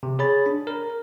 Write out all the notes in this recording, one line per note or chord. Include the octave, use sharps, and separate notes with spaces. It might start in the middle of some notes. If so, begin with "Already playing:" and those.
C3
G#4 C#5 B5 A6
D4
A#4